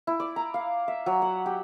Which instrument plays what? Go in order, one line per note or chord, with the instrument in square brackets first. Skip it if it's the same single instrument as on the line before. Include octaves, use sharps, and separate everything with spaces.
[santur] E4
D5
A#5
F5
E5
F#3
F#5
G4